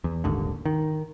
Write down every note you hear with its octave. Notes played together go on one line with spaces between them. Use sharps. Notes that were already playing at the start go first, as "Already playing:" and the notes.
E2
D#1 G#1 D#2 D3
D#3